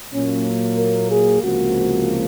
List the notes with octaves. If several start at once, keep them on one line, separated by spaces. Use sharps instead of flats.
A#2 F#3 A#3 C#4
A#4
G#4
C#2 C3 F3 A#3 F#4